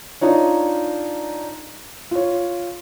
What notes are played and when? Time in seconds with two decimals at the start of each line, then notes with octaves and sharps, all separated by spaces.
0.21 D4 D#4 F4 C#5
2.11 F4 C#5